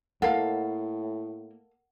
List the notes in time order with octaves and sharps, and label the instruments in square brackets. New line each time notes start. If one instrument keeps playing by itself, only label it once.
[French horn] A2 [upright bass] A#3 [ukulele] A4 A#4 F5 [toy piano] F#5